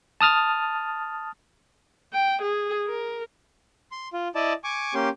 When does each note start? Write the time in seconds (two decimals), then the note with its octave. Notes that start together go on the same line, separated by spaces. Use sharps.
0.21 A5 D#6 F6 A6
2.13 G5
2.42 G#4
2.87 A#4
3.92 C6
4.13 F4
4.35 E4 D5 D#5 A5
4.64 G#5 C#6 D6
4.94 A#3 C#4 G4 C6